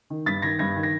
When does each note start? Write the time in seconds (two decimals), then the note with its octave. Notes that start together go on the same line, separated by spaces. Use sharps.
0.10 D#3
0.26 G2 A6 B6
0.42 D#3 G#6 A#6
0.59 G2 G#6 A#6
0.76 D#3
0.83 A#6